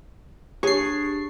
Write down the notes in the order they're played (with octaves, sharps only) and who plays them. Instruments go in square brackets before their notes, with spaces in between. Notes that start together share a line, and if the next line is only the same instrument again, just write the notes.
[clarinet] D4 [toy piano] G4 [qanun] G#4 C#5 [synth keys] C#6 C7